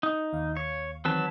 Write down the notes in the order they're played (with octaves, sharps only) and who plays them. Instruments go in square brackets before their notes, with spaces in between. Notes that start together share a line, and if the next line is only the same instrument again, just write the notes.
[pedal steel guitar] D#4
[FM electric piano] D#2 F5
[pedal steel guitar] C#5
[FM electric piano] D#3 E3 C4 [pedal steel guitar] F#3 B4 A5